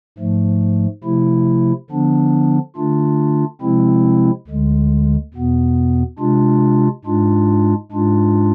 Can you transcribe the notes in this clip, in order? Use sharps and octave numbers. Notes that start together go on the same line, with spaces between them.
G#2 F3 A3
C3 F3 A3 E4
D3 F3 B3 D4
D3 A3 D4 F4
C3 F3 G#3 C4 E4
D2 D3 G#3
E2 B2 B3
C3 G#3 D4 F4
G#2 G#3 D4 F4
G#2 G#3 D4 F4